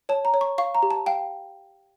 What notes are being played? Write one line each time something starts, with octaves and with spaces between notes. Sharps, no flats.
C#5 A5
A#5
C#5
C#6
F5 C#6
A#5
G4
A5
F5 G5